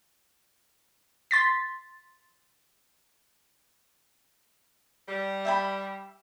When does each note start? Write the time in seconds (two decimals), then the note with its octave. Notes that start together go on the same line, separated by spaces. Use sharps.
1.31 C6 A6 B6
5.08 G3
5.45 E5 G5 B5